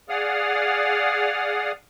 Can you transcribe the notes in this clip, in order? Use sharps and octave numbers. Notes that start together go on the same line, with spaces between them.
G#4 D5 F5 F#5 D#6 F6